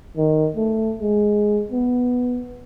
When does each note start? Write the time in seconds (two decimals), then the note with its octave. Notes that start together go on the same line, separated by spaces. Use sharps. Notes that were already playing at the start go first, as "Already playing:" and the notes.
0.17 D#3
0.56 A3
1.01 G#3
1.72 B3